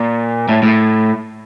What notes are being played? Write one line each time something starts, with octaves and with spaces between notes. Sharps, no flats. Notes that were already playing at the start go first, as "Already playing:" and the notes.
Already playing: A#2
A2
A2